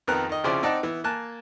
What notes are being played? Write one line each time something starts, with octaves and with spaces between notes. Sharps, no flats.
F2 D#3 B3 A#4 F#6
D#3 D#5
C2 C#3 F3 E4 C5 D5
C4 D#4 D5 F#5 A5
E3 B3
A#3 G#5 A5 F#6